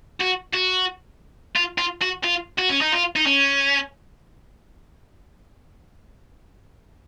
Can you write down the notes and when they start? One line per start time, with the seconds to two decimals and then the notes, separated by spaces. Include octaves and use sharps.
0.20 F#4
0.53 F#4
1.56 F4
1.78 F4
2.02 F#4
2.24 F4
2.58 F#4
2.69 C#4
2.81 D#4
2.92 F4
3.16 D#4
3.26 C#4